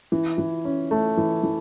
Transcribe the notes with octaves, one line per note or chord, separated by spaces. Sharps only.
E3
E3
C#4
A3
E3
E3